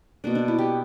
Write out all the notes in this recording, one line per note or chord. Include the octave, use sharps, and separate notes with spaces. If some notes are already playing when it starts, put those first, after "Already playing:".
B2 A#3 D4
D4
E4
G4